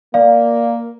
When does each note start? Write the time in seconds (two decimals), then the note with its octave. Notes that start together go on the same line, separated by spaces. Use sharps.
0.14 A#3 D5 F5